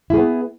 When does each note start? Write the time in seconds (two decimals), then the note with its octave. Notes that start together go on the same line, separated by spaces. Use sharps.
0.10 E4
0.14 G#4
0.17 B3